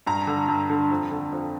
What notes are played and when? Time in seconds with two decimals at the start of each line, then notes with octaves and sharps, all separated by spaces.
0.06 G2 A#5
0.27 D3
0.48 G2
0.69 D3
0.91 F2
1.11 D3
1.32 F2